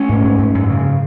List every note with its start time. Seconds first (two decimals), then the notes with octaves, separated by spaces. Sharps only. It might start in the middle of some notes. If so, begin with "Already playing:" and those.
Already playing: A3 C#4
0.09 G#2
0.24 G#2
0.39 G#2
0.55 F#2
0.70 C#3